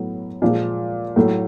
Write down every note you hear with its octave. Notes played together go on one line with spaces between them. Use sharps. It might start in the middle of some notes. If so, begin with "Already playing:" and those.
Already playing: A2 F#3 B3
A#2 F3 G#3
A2 F#3 A3